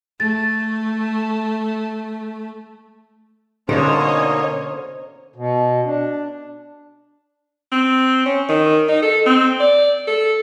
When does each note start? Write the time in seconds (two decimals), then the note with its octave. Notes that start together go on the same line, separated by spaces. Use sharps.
0.20 A3 A6
3.69 B2 D3 A#3 C#4 D#4 C5 C#5 D#5
5.36 B2
5.85 D4
7.72 C4
8.26 C#4
8.49 D#3
8.88 D#4
9.02 A4
9.26 C4
9.60 D5
10.07 A4